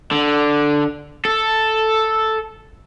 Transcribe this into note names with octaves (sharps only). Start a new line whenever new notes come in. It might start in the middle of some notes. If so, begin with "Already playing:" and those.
D3
A4